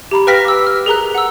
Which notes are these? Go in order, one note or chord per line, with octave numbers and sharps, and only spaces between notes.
G4 A#5 B5
B4 F5 G5 F6 A#6 B6
D6 E6
F6
G#4 A#4 A#5 F#6
F#5 E6